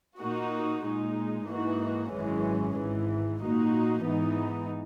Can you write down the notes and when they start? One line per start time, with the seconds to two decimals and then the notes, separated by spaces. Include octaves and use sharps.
0.19 A#2 A#3 D#4 F#4
0.84 A#2 G#3 D#4
1.47 G#2 E3 A#3 D#4 F#4
2.11 G#1 F#2 E3 G#3 C#4
2.76 G#1 G#2 E3
3.40 A#2 A#3 D#4 F#4
4.04 G#2 E3 B3 D#4